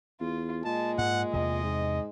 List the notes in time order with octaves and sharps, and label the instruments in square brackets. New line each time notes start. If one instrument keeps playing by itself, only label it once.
[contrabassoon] E2 [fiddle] F4
[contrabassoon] A#2 [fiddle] G#3 [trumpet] A5
[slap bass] G#2 [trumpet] F#5
[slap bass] E2 C3 [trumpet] D#5
[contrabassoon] G#2